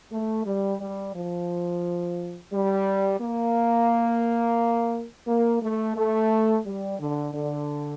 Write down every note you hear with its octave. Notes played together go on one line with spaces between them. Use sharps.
A3
G3
G3
F3
G3
A#3
A#3
A3
A3
G3
D3
D3